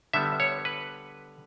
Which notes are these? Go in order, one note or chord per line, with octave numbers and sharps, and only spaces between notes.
D3 G3 B3 E5
C#5
B4